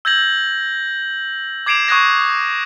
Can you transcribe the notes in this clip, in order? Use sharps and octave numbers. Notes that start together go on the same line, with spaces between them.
E6 G6 G#6 A#6 F#7
D6 G#6 C7 D7 E7 F7
C#6 D#6 F#6 G#6 A#6